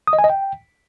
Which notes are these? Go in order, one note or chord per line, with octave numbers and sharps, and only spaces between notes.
D#6
D#5
G#5
D#5
G5